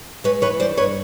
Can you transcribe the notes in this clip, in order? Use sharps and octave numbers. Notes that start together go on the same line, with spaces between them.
G#3 B4 C#5
E3 B4 C#5
G2 C5 D5
G2 B4 C#5